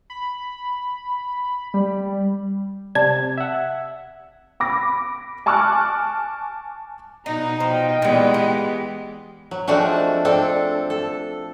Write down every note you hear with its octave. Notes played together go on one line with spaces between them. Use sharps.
B5
G3
C3 D5 A5 G#6
E5 F#5
B5 D6 A#6
G#5 A5 C#6 D6 F6 F#6
B2 D#4 D#5 A#5
F3 D#5 G5
A#2 E3 G3 G#3 B3
G4
F#3
F3 G#3 A3 C4 D4 F#4
C4 D4 A4
A4